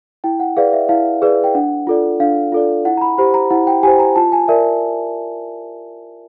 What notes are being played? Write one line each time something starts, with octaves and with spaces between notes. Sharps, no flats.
E4 G5
F#5
G#4 B4 D5 F5
E5
E4 F5
G#4 B4 D5
G5
D4 F#5
F4 A4 D5
D4 F5
F4 A4 D5
E4 F#5
A#5
B5
G4 C5 B5
A#5
E4 F#5
G5
G4 C5 G#5
A#5
F4 A5
G#5
A#4 D5 E5